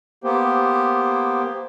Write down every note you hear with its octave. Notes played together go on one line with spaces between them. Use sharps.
A#3 B3 G4 C5